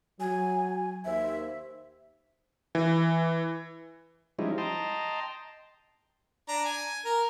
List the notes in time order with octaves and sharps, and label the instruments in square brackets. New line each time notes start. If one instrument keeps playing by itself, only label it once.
[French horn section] F#3 [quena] G#5
[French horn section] D#2 C5 [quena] E5
[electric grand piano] E3
[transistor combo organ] F3 G3 G#3 C#4 D#4 E4
D#5 G5 A5 A#5 C6
[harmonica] D4 A#5
G#5
A#4